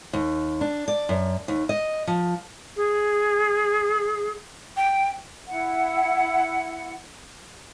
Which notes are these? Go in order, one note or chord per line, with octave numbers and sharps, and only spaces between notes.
D#2
D4
D5
F#2
D#2
D#5
F3
G#4
G5
E4 F#5